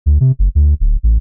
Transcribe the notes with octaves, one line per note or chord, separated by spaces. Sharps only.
D2
C3
F#1
D2
D1
A1